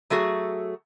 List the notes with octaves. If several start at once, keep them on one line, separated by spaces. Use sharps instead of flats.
F#3 A3 F#4 G#4